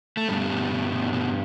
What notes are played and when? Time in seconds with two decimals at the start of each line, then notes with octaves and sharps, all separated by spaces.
0.17 A3
0.28 G2 B2 G3
0.50 B2
0.71 B2
0.92 B2
1.13 B2